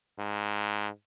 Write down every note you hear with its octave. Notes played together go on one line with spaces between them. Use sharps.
G#2